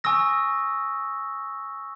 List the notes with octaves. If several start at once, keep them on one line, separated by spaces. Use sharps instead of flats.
G#5 C#6 D#6 E6 A#6